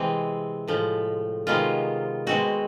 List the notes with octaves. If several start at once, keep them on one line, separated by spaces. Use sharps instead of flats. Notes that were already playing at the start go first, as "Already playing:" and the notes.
Already playing: C3 E3 G#3 C4
A2 F3 G#3
C3 D#3 G#3 B3 F4
B2 G#3 C4 F#4